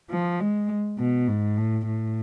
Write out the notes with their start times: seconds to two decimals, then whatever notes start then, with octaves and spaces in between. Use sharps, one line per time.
0.11 F3
0.40 G#3
0.98 B2
1.28 G#2
1.58 A2
1.87 A2